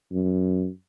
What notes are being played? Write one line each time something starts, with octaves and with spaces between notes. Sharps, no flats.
F#2